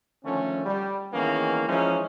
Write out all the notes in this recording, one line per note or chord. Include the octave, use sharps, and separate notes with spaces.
D3 D#3 F3 A3 C#4
G3
D#3 E3 G#3 A#3 B3 C#4
E3 F3 G#3 C#4 D#4 C5